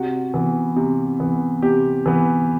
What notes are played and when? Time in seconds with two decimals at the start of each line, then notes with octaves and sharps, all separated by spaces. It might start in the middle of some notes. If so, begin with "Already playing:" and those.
Already playing: C3 F#4
0.34 E3 B3
0.76 C3
1.20 E3 B3
1.62 C3 G4
2.06 E3 B3